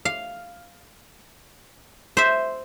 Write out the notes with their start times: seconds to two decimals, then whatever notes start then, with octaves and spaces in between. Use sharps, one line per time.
0.05 F5
2.17 C5 E5